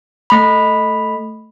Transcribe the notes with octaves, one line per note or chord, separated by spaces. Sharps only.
A3 B5